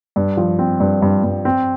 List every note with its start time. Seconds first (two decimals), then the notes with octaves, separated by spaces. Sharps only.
0.16 G2
0.37 F3
0.59 C4
0.80 G2
1.02 G2
1.24 G2
1.45 C4